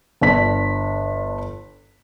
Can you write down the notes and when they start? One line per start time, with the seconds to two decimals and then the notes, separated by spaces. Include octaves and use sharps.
0.21 G1 D4 B6